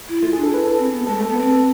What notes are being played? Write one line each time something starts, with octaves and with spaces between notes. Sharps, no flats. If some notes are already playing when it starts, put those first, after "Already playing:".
E4
A3 F4
G#4
D4
A4
E4 B4
A4
C4
B3
G#3 A4
A3
A4
B3
C4 B4
A4